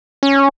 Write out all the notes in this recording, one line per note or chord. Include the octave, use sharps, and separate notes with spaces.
C#4